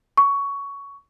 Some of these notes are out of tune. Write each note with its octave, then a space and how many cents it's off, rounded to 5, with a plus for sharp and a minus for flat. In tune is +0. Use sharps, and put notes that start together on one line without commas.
C#6 +15